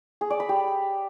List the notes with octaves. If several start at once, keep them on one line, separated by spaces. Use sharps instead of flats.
G#4
D5
B5
G4